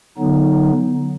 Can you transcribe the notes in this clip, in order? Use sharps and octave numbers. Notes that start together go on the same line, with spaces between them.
D3 F#3 B3 D#4